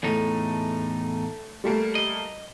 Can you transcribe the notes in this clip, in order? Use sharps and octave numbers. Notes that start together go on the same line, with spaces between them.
E2 A2 A3 D#4
G3 A3 A#3
D#5